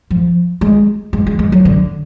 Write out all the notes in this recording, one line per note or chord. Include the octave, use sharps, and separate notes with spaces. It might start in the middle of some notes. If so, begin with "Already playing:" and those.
F3
G#3
G#3
G#3
G#3
F#3
D3